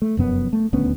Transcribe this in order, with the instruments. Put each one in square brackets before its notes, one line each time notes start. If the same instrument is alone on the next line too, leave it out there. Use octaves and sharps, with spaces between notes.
[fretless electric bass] A3
F1 F#2 B3
A3
D#1 D2 B3 C#4